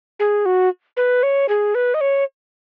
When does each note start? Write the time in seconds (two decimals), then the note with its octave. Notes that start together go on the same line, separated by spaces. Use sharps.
0.20 G#4
0.46 F#4
0.97 B4
1.23 C#5
1.49 G#4
1.75 B4
1.94 D#5
2.01 C#5